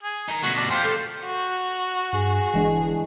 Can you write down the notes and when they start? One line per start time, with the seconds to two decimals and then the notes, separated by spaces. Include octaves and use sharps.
0.03 G#4
0.28 D#4 A#4
0.43 D2 B2 F#4
0.56 D4
0.71 F4 G4 C5 F5 G5
0.84 A4
1.26 F#4
2.13 G2 G#4
2.54 G1 E3 G#3 D4